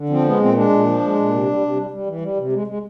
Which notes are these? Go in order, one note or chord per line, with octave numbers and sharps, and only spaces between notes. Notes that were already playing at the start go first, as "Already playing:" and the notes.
Already playing: D3
F3 C4
G#3 B3
A#2 C4
G#3 D4
A#2
F3
G#3
A#2
C3
G3
C3
G3
G3
E3
G3
C3
G#3
G#3